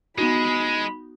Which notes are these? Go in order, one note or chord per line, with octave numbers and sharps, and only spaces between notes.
G#3 B3 D#4 F#4 B5